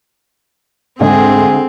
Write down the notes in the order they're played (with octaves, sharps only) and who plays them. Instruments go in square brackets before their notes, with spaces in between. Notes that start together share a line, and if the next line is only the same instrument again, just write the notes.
[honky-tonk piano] D2 G#3 [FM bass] G#2 [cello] C4 [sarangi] G#4